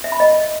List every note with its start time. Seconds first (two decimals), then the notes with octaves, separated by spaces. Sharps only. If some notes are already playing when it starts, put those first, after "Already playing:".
0.04 E5
0.12 B5
0.20 D#5